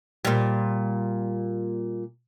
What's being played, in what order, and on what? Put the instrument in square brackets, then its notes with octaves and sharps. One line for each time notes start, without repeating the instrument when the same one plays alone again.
[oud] A#2 G3